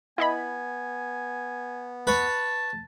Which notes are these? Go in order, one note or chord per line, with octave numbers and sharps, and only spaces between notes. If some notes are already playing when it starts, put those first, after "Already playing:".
B3 E4 D#5 G#5 B5
B4 C#5 A5